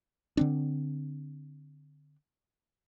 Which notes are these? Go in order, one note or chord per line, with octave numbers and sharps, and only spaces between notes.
D3 C4 D4